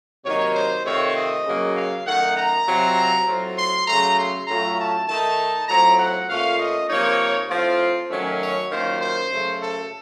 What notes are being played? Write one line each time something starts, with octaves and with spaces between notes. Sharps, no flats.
C3 D#3 F#3 A#3 D#4 C#5
C5
C3 D#3 A3 C4 F4 C#5
D#5
C#3 F#3 A#3
F5
F#2 D#3 A3 D#4 F#5
A#5
C3 F#3 C4 F4
A2 F#3 C4 F4
C6
C#3 F#3 A3 A#5
C6
A2 F#3 A3 C#4 F4 A#5
A5
D#3 A3 D#4 A5
A2 F#3 C4 F4 A#5
F#5
A#2 A3 C#4 F4 F5
D#5
C3 F3 A#3 D#4 C#5
A2 F3 C4 F4
D#3 F#3 A3 C#4
C#5
F#2 D#3 A#3 C#4 F4 C5
C5
F#2 C#3 A3
A4